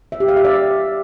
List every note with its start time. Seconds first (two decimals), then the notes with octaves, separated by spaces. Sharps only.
0.12 E5
0.20 G4
0.28 F5
0.37 E5
0.45 D5